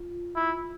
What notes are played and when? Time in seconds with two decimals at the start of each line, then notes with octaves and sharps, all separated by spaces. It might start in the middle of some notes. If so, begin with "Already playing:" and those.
Already playing: F4
0.35 E4